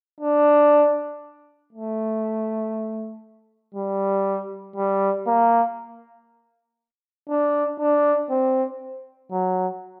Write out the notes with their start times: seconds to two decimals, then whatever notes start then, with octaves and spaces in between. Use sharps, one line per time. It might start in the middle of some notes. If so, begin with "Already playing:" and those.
0.20 D4
1.73 A3
3.75 G3
4.76 G3
5.27 A#3
7.29 D4
7.79 D4
8.30 C4
9.31 F#3